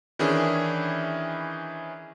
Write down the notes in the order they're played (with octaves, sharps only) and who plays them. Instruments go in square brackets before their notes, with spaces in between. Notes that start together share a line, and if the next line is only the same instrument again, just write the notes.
[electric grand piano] D#3 E3 C#4 D4 E4 G#4